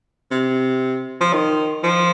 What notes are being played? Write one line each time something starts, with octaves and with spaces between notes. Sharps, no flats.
C3
F3
D#3
F3